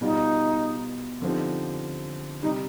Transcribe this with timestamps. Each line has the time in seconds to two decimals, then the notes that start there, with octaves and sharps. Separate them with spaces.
0.01 B2 G3 B3 D#4 F4
1.22 D3 F3 C4 D#4 G4
2.42 C3 G3 D#4